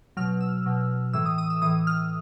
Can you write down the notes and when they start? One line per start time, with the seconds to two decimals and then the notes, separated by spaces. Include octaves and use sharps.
0.17 B2 F#3 F6
0.41 E6
0.66 B2 F#3
1.13 A2 E3 E6
1.26 D#6
1.38 D#6
1.50 E6
1.62 A2 E3 D#6
1.87 F6